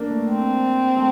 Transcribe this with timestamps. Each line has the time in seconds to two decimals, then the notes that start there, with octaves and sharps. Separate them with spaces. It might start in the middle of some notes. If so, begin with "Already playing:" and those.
Already playing: A#3 D4
0.11 A3
0.30 C4
0.96 A3